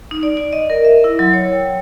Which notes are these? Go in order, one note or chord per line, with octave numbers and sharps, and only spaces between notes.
D#4
D5
D5
D#5
A#4
E5
E4
F#3
C#5
G5